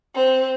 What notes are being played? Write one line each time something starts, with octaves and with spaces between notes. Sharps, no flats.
C4